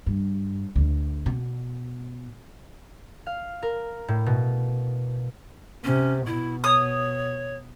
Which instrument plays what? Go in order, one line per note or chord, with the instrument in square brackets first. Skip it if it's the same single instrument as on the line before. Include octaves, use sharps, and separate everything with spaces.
[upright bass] G2
D2
B2
[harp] F5
A#4
A2
B2
[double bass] C3 [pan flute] C#4
[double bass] B2 [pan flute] E4
[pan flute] C#5 [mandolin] D#6